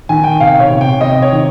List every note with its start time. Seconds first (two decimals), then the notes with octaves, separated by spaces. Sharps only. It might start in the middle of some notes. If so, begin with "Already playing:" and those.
0.09 D#3 G#5
0.24 G5
0.40 C3 F5
0.60 C#5
0.70 C3
0.81 G5
1.01 C3 D#5
1.22 C#5
1.32 D#3